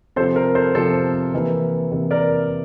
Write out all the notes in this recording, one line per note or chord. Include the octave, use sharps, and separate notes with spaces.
C3 F3 C4 A4 C5
A#4
A4 C5
C3 F3 C4 A4 C5
C3 E3 A#3
C3 E3 A#3
A#4 D5